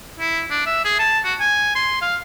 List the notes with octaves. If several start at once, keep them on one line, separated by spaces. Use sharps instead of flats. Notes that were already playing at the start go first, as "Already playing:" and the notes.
E4
D4
E5
G#4
A5
F#4
G#5
C6
F5